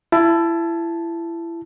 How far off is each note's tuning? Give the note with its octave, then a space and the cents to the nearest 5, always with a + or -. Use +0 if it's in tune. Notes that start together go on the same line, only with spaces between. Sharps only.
E4 +25 A5 +0